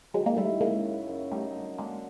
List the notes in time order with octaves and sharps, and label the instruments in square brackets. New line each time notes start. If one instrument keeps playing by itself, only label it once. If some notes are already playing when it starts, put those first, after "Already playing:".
[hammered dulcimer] D#3 [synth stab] F#3 G#3
[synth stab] G#3 A#3
[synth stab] G3 A3 [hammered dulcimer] E4
[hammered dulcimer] C#3 [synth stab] G#3 A#3
[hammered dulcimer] F#2
F#2
[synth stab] G3 A3 [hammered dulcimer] D#4
[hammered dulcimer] D3
[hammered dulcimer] D3 [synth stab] G#3 A#3